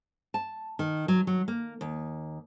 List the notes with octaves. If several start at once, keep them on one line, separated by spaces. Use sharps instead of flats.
A5
D#3
F#3
F#3
A#3
D#2